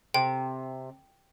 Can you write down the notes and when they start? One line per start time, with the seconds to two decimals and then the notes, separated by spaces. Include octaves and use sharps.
0.14 C3 G5